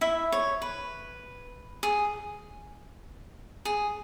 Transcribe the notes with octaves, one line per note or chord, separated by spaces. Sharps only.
E4 E5
C#5
B4
G#4
G#4